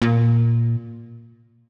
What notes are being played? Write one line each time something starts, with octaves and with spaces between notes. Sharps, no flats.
A#2